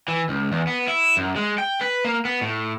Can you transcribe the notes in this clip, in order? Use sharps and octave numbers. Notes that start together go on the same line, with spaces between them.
E3
C#2
E2
B3
E4
F#2
G#3
G5
B4
A#3
B3
A2